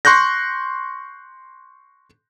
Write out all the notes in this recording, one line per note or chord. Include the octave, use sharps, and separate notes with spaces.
C6 C#6 F#6 G6 A#6